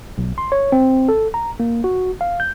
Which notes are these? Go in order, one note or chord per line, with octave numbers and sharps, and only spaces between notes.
B1
C6
C#5
C4
A4
A#5
A#3
F#4
F5
G6